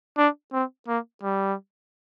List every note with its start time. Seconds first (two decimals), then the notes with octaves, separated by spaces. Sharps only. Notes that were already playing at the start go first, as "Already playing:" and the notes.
0.18 D4
0.53 C4
0.88 A#3
1.23 G3